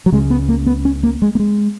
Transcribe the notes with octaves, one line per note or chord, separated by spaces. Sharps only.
F#3
C#2 C#3 G#3
B3
A#3
B3
C#4
A#3
G#3
A#3
G#3